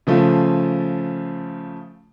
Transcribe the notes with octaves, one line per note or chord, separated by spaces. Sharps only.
C#3 F3 A3 F4